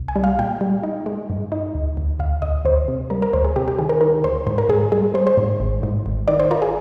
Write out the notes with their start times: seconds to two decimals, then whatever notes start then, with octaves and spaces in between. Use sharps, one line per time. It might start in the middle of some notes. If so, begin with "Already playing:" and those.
Already playing: C2
0.08 G#5
0.16 G3
0.24 F5
0.39 A#2 G5
0.61 G3
0.83 D#4
1.06 G#3
1.30 G2
1.52 D#4
1.75 D2
1.97 D2
2.20 D2 F5
2.42 D2 D#5
2.65 D2 C5
2.88 C3
3.10 G3 A#4
3.22 A#4
3.33 D2 C5
3.44 G#4
3.56 C3 G4
3.68 G4
3.79 D#3 G#4
3.89 A#4
4.01 D#3 A#4
4.24 D2 C5
4.47 G#2 C5
4.58 A#4
4.69 G#2 G#4
4.92 G3 G#4
5.14 G3 C5
5.27 C5
5.37 G#2
5.60 G#1
5.83 G#2
6.06 G#1
6.28 D#3 D5
6.40 C5
6.51 F4 A#4
6.62 G#4